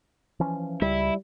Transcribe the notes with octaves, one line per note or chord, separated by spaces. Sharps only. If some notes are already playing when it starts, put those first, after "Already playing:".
E3 F3 C#4
C#2 G3 E4